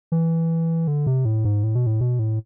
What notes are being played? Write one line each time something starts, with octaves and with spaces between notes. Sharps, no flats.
E3
D3
C3
A2
G#2
A2
B2
A2
B2
A2